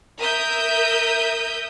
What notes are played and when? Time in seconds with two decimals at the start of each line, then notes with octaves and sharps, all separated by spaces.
0.19 A#4 E5 D#6 G6